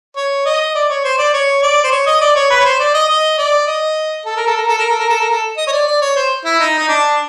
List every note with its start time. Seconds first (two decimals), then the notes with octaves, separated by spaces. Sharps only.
0.16 C#5
0.45 D#5
0.75 D5
0.89 C#5
1.04 C5
1.19 D5
1.33 C#5
1.63 D5
1.84 C5
1.92 C#5
2.06 D#5
2.21 D5
2.35 C#5
2.50 B4
2.59 C#5
2.65 C5
2.79 D5
2.94 D#5
3.09 D#5
3.38 D5
3.67 D#5
4.26 A4
4.36 A#4
4.47 A4
4.57 A#4
4.68 A4
4.78 A#4
4.89 A4
4.99 A#4
5.09 A4
5.20 A#4
5.30 A4
5.57 D#5
5.67 C#5
5.72 D5
5.87 D5
6.01 C#5
6.16 C5
6.45 E4
6.60 D#4
6.78 D#4
6.89 D4